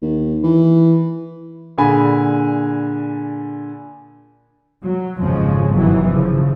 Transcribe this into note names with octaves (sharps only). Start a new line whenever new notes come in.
D#2
E3
A#2 D3 G#4 G#5 B5
F#3
G#1 F2 C#3 F3 G#3 C#4
G1 C3 D#3 E3 F#3
C#3 F3